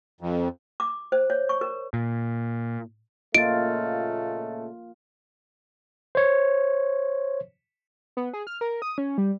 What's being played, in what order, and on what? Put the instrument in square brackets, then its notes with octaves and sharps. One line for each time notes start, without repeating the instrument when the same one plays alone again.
[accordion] F2
[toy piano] D6
C5
C#5
C#6
A#4
[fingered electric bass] A#2
[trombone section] A#2 C#3 A3 [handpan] A#3 F4 [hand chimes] D#5 A6 [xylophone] D7
[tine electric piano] C5 C#5
[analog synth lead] B3
G#4
F6
A#4
D#6
C#4
G3